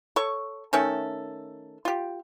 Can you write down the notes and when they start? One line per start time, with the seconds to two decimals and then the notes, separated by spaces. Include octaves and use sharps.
0.16 A4 C#5 C#6
0.73 D#3 A3 C#4 A4
1.85 F4 G4